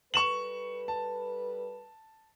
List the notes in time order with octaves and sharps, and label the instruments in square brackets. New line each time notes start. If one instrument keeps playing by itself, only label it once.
[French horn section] G3 A4 B4 [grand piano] C#6 E7 F#7
[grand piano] A5